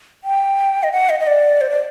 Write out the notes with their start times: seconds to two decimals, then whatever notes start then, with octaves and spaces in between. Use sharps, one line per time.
0.24 G5
0.83 D#5
0.92 F#5
1.10 D#5
1.20 D#5
1.27 D5
1.61 C5
1.70 D5